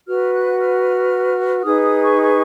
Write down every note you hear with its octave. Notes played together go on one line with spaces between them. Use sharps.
F#4 B4 F6
F#6
F6
D#4 G#4 B4 D#6
D#6
C#6
C#6